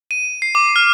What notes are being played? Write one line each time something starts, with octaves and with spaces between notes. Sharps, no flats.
D#7
C7
D6
F6